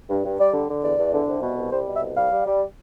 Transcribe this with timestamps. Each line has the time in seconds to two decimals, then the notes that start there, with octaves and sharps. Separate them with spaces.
0.09 G2
0.24 G2
0.39 G3 D5
0.53 D3
0.69 D3
0.83 E2 D5
0.98 E2
1.13 D3
1.28 C2
1.42 B2
1.58 C2
1.71 G3 C5
1.86 B2
1.95 E5
2.02 C2
2.16 G3 F5
2.31 G3
2.46 G3